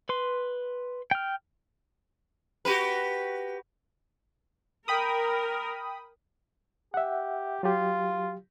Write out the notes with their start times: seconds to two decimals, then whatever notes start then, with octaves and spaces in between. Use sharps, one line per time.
0.09 B4 C6
1.11 G5 F6
2.65 F#4 G4 B4
4.88 A#4 G5 B5 D#6
6.94 G4 E5 F#5
7.63 F#3 F4 G4